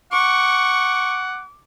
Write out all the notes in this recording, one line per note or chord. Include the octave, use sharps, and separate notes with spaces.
F#5 C#6 D6